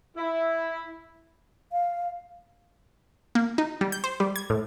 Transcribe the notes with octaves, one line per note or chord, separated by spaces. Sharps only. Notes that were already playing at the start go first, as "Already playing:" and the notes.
E4
F5
A#3
D#4
G3
G6
C5
G3
G#6
A2